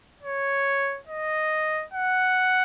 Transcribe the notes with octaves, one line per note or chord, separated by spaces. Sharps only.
C#5
D#5
F#5